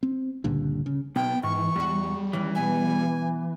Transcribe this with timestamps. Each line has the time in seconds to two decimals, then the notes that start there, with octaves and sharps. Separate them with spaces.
0.03 C4
0.44 C#2 G2 A#2 D3
0.86 C#3
1.16 B1 B3 G5
1.43 G#2 E3 C#6
1.76 E2 G3 G#3 F#4
2.33 E2 D#3 E3 C#4
2.55 B2 B3 E5 G#5